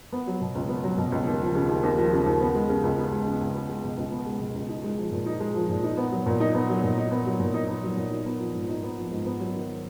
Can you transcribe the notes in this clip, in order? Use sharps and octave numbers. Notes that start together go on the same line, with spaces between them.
B3
F#3
B2
C#2
B3
F#3
B2
C#2
D#2
F3
C#3
D#2
D#2
F3
C#3
D#2
B3
G#3
C#3
C#2
B3
G#3
C#3
C#2
B3
G#3
B2
C#2
B3
G#3
B2
C#2
D#4
G#3
F3
A#2
D#4
G#3
F3
A#2
D#4
B3
F#3
A#2
D#4
B3
F#3
A#2
D#4
B3
F#3
A#2
D#4
B3
F#3
A#2
D#4
B3
F3
G#2
D#4
B3
F3
G#2
B3
F#3
D#3